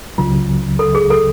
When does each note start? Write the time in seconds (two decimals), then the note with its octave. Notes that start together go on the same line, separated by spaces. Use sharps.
0.18 C#2 C#3 F#3 F4
0.79 A4
0.95 G#4
1.10 A4